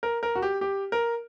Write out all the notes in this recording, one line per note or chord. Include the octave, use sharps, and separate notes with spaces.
A#4
A#4
F#4
G4
G4
A#4